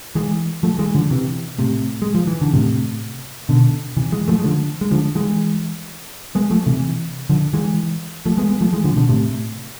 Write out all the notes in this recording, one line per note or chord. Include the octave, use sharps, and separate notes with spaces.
E3 G#3
F3 A3
E3 G#3
D3 F3
C3 E3
A2 C3
G#3
F3
E3
D3
A2 C3
B2 D3
C3 E3
E3 G#3
F3 A3
G#3
D3 F3
G#3
D3 F3
E3 G#3
G#3 B3
F3 A3
C3 E3
D3 F3
E3 G#3
F3 A3
G#3 B3
G#3 B3
F3 A3
E3 G#3
D3 F3
C3
B2 D3
A2 C3